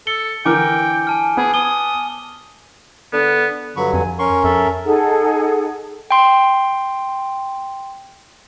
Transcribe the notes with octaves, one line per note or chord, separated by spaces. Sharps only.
A4 C#7 G7
D3 E3 A#4 G5 G#5 D6
G#5 A5 F6
B3 G#4
D#6 G7
D3 B3
G2 D3 F#3 B5 C#6
F2 G#5
C#4 A#4 C6 C#6
F2 A4 E5
D#4 G#4 A4 F#5
G5 C6